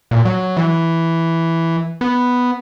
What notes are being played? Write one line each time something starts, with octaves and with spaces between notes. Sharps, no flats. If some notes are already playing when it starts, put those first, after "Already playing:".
A#2
F#3
E3
B3